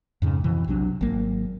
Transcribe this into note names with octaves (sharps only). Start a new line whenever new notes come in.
F2 G#2 C#3
F2 B2 E3
B1 C3 F#3 D4
G#1 F#3 A#3